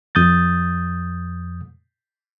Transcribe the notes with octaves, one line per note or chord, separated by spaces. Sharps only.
F2 D#6 G6 A6